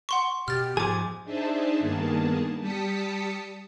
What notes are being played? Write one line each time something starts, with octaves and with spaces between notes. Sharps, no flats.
F#5 C6 C#6
B2 G4 F6 A6
G#2 F3 G#4 G#5 D6
D4 D#4 G#4 C5 E5 A5
G2 D#3 A#3 B3 G#4 A5
G3 G4 A5 D#6 B6 C#7